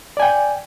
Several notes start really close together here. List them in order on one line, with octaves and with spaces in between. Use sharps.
D5 G#5 G5